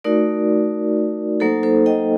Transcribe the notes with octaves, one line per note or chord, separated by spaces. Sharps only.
A3 D#4 F#4 A#4 D5
F#3 A#3 D#4 A4 C5
A4 C5
D#5 G5